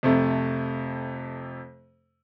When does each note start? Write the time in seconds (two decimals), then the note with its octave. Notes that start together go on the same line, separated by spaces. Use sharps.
0.03 F2 C3 A3